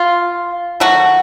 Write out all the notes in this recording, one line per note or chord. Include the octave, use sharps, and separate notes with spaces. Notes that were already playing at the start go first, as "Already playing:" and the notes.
Already playing: F4
D#3 F#3 A3 F#4